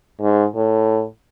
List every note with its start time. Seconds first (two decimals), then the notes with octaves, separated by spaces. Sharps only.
0.21 G#2
0.55 A2